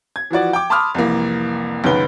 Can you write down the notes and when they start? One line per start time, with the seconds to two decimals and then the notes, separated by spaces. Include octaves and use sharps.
0.16 G#6
0.30 E3 F3 F#4 D5
0.53 G5 D6
0.70 A5 B5 C6 D6 D#6 F6
0.95 C2 F2 E3 A#3
1.84 C#2 F#2 D#3 B3 B4 G7